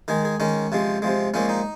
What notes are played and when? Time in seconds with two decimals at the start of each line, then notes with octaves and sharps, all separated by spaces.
0.08 D#3 G#3 G#4
0.25 G#4
0.40 D#3 G#3 C#4
0.72 C3 F3 G#3
1.02 C3 F3 G#3
1.34 A#2 F3 G#3 C#4
1.49 D#4